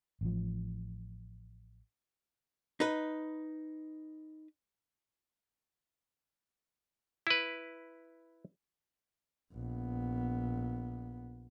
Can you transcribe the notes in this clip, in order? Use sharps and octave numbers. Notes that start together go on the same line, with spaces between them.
A1 F3
D#4 B4
E4 B4
A#1 B3